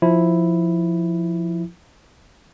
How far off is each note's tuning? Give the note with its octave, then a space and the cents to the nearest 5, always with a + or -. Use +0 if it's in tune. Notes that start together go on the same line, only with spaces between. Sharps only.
F3 +0 E4 +0